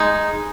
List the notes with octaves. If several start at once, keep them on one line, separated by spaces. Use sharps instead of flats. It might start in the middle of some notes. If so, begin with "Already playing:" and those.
Already playing: G#3 D#4 G#5